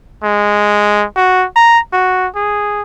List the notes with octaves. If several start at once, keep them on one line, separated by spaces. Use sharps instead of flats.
G#3
F#4
A#5
F#4
G#4